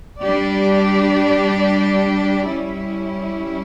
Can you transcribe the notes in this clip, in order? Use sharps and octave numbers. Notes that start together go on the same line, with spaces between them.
G3 D4 G4 D5
G3 C#4 E4